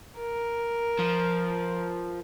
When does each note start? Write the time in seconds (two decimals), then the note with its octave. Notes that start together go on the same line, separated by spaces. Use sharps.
0.19 A#4
0.99 F3